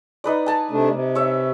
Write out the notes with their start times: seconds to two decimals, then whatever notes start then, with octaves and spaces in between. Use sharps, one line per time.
0.24 D#4 B4 D5
0.46 G#5 A5
0.71 C3 A3 D4
0.91 C3
1.15 C#5 E5